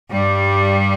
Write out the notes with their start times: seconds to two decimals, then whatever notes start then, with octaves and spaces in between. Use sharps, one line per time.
0.11 G2 G3